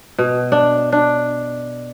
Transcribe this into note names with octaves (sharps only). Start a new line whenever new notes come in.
B2
D4
D4